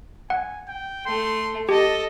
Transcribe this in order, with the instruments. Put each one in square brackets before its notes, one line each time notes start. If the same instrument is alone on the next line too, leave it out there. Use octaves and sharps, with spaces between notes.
[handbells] F#5 [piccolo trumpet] G#5
[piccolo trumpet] G5
[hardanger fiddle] A3 [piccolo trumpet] C6
[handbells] G4 [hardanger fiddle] A4 D#5 [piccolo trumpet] A5